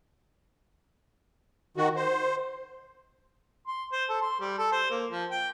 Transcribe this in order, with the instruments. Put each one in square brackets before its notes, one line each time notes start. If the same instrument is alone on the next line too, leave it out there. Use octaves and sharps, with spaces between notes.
[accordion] D#3 F#4
C5
[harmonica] C6
C5
A4
C6
G3
A4
C5
A#3
F3
G5